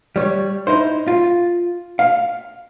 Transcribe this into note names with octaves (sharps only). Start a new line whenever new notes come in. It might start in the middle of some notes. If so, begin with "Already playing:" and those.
G3 C#5
D#4 E4 C5
F4
F5